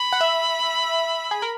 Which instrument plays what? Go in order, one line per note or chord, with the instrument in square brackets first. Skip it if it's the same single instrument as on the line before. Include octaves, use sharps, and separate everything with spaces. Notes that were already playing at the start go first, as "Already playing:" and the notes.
Already playing: [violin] B5
[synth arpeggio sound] F#5
E5
G#4
A#4